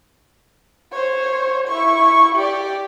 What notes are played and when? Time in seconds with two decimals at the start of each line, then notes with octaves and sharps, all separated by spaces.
0.92 C5 C#5
1.67 E4 C#6
2.35 G4 D5